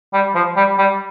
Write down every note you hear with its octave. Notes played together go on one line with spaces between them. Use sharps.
G3
F3
G3
G3